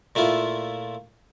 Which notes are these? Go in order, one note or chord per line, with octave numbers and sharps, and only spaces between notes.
A#2 A3 E4 F4